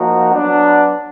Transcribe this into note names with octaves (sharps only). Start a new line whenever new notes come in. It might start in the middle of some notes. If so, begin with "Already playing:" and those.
Already playing: F3 A#3 D#4 F#4
F#3 B3 D4